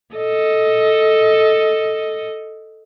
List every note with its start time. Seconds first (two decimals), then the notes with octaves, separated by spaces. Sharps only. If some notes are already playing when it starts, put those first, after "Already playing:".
0.15 A4 D#5